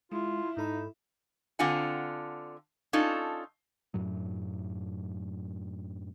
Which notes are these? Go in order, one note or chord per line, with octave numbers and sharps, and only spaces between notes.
G#3 E4 F4
G#2 D#4 A4 B5
D3 C4 D4 F4 F#5 G#5
C#4 D#4 F4 A4 D5
F#2 A2 F#3